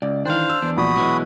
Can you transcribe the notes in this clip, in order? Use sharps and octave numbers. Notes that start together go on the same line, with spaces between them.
C#2 D5
D#3 E3 D4 C5 F5
E6
E2 D4
A#1 F#4 B5 D#6
B2 E3 F#3 G#3